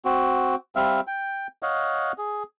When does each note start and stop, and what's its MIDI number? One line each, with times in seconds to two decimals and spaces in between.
0.05 0.55 60
0.05 0.55 66
0.76 1.01 55
0.76 1.01 60
0.76 1.01 76
0.76 1.01 77
1.07 1.47 79
1.63 2.12 73
1.63 2.12 75
1.63 2.12 77
1.63 2.12 78
2.18 2.43 68